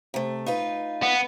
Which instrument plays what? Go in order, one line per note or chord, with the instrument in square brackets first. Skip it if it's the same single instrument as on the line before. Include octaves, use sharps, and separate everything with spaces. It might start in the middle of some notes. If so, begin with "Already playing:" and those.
[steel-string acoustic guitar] C3 A3
D#4 F4 B4
[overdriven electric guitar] B3